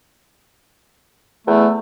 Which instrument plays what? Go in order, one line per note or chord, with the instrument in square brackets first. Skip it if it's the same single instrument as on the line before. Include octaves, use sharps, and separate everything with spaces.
[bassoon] E2 [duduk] A3